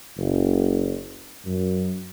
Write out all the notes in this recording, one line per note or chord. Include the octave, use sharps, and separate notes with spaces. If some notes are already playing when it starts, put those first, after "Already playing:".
F#1
F#2